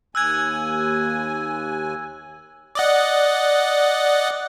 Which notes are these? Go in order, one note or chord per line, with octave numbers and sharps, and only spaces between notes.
D#2 G#5 E6 F#6 G#6
D5 D#5 F#5